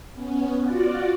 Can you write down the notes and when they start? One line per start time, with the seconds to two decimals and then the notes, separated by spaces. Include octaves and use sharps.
0.14 B3 C#4
0.60 F4 F#4 D5